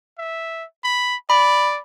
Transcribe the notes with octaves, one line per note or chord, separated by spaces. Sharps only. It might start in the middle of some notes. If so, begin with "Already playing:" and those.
E5
B5
D5 B5